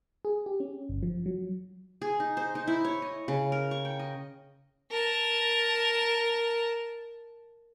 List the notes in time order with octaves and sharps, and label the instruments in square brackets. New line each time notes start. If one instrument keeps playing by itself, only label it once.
[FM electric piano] G#4
G4
C#4
G1
F3
F#3
[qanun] G#4
D#4
C5
D#4
E4
C#5
D#5
C#3
A#4
C#6
G5
D#5
[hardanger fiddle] A#4 A5